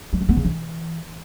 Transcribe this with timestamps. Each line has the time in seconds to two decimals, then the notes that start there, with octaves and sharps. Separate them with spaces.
0.13 G3
0.21 F#3
0.29 B3
0.37 C#3
0.45 E3